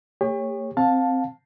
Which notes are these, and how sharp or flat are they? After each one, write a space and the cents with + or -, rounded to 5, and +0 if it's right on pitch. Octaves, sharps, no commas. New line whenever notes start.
A#3 -45 G4 +40 C#5 -10
C4 +0 F5 +25 A5 +0